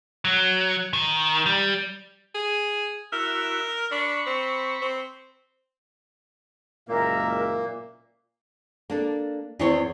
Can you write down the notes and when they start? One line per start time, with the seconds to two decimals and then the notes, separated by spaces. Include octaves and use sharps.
0.25 F#3
0.93 D#3
1.46 G3
2.35 G#4
3.12 E4 F#4 A#4 E5
3.92 D4 B5 C#6
4.27 C4
4.82 C4
6.89 F#1 A#2 G#3 A#3 A#4 E5
8.90 A#3 D4 A4
9.59 E2 D#3 C4 E4 C5 C#5